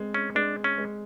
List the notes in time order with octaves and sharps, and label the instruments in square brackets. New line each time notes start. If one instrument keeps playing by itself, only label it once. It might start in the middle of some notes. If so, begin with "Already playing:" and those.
Already playing: [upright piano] G#3 C4
[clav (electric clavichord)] C#4
[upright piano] G#3 [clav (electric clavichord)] D4
[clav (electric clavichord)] C#4
[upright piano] G#3